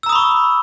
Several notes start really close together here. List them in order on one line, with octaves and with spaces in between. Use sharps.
E6 A#5 D#6 B5 C#6